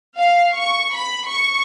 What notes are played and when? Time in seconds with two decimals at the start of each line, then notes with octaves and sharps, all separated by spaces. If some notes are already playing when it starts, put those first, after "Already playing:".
0.17 F5
0.54 C#6
0.95 B5
1.27 C#6